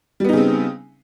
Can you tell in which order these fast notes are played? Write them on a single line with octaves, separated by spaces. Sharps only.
G3 B3 D#4 C#3 C4